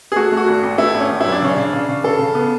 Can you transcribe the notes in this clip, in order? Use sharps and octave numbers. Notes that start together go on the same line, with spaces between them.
G#4
A3 F#4
A3
F#4
G#1
G#1
A3 E4
G#1
C#4
G#1
F#2 E4
D4
C#3 C#4
C#3 D4
C#3
C#3
C#3 A4
C#3
B3